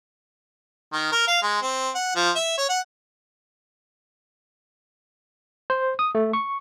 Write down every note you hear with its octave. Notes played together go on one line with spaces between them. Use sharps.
D#3
A#4
F5
G#3
C4
F#5
F3
E5
C#5
F#5
C5
D#6
A3
C#6